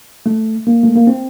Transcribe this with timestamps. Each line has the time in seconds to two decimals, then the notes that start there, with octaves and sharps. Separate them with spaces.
0.26 A3
0.67 A#3
0.83 A3
0.96 A#3
1.07 C4